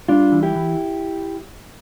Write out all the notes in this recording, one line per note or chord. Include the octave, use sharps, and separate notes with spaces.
G3 D4 F4
E3
E4 G4
E3